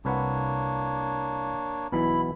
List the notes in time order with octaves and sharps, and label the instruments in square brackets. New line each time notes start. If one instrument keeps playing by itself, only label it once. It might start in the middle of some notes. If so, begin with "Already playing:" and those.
[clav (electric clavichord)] C2 B4 F#5 [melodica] A#3 D4 C#5
[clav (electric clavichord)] B1 B2 E3 [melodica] E4 B5